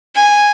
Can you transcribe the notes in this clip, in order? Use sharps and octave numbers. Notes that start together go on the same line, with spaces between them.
G#5